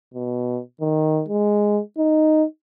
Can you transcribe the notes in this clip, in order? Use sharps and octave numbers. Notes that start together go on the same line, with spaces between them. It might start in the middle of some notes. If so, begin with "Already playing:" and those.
B2
D#3
G#3
D#4